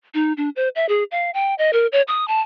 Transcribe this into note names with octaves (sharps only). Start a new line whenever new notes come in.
D#4
D4
C5
E5
G#4
F5
G5
D#5
A#4
C#5
D#6
A5